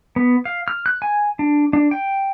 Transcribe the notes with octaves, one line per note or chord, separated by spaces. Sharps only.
B3
F5
F6
F#6
G#5
D4
D4
G5